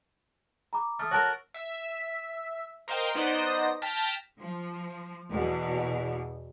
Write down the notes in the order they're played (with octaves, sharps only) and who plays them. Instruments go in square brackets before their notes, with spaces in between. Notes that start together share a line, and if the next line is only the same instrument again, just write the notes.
[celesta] A#5 B5 D6
[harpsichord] A3 [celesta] D#6 F6
[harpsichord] F#4 A4 A#4 [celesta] C#5 A5 F6
[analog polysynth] E5
A#4 C5 D#5 F5 G5
B3 D#4 C5 D5 D#5 A#6
G5 A5 F6 A#6 B6
[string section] F3
E2 B2